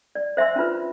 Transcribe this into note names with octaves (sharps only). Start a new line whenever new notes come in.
D5
C5 E5 G#5 C6 E6
C#4 D4 F4 B4